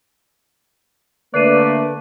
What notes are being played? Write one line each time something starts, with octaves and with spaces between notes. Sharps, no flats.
D3 A3 A#3 B4 D5 F#6 C7 D#7